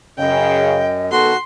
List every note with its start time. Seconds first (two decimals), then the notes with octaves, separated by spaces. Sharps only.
0.18 F#2 C#3 D#5 G5
1.11 D#3 B3 F#4 A4 C6